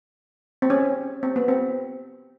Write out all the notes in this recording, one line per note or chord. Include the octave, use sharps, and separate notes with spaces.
C4
C#4
C4
B3
C4